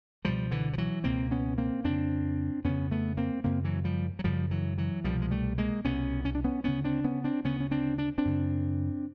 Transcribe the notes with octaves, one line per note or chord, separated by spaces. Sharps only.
C#2 B2 F3 G3
D3 E3
F3
E3 F#3
C#2 B2 A#3 C4
B3 C#4
A#3 C4
F2 C#3 C4 D4
F2 C#3 B3 C#4
A3 B3
A#3 C4
F#2 C#3 A#3 C4
E3 F#3
F3 G3
F#3
F#2 C#3 F3 G3
E3 F#3
E3 F#3
C2 B2 F3 G3
G#3
G3 A3
G#3 A#3
C2 B2 B3 C#4
C#4
D4
B3 C#4
D2 C#3 B3 C#4
C4 D4
B3 C#4
C4 D4
D2 C#3 B3 C#4
C#4
C4 D4
D4
C4 D4
F#2 C#3